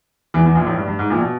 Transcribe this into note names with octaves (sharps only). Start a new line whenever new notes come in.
E2 E3
E2 E3
A#1 A#2
A1 A2
G2
G2
G#2
A#1 A#2
B2